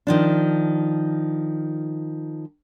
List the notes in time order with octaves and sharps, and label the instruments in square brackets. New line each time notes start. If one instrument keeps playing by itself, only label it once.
[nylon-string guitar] D#3 F3 D4